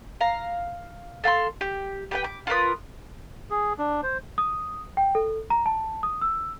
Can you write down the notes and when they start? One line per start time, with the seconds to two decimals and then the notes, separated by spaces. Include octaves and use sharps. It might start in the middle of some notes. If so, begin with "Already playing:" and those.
0.21 F5 A#5
1.24 A4 F5 F#5 C6
1.61 G4
2.11 G4 B4 G5
2.24 D6
2.47 F4 A#4 B4 D#6
3.50 G#4
3.78 D4
4.03 C5
4.38 D#6
4.97 G5
5.15 A4
5.50 A#5
5.66 A5
6.03 D#6
6.22 E6